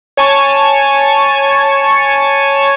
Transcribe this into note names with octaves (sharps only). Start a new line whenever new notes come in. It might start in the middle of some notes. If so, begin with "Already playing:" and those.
C#5 G#5 A5 C#6